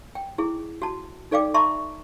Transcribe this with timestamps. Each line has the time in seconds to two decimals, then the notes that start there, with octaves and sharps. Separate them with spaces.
0.15 G5
0.38 E4 G#4
0.82 F#4 A5
1.31 D#4 A4 D5 F5 G5 D6
1.54 E5 A5 A#5 C6 C#6